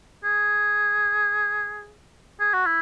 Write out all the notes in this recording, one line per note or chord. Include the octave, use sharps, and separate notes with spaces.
G#4
G#4
F#4
E4